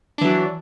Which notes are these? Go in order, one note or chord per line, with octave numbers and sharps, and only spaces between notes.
E3 F#3 D4